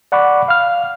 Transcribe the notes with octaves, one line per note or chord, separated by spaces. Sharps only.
D5 F#5 B5 C#6 D6
F5 F6